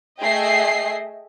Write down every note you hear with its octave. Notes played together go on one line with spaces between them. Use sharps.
A3 G#4 D#5 E5 G5 C7